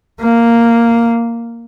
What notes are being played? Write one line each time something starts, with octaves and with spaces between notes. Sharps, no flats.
A#3